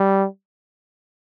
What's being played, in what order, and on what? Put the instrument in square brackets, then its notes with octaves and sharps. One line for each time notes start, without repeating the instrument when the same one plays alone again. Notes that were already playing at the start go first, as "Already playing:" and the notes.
Already playing: [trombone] G3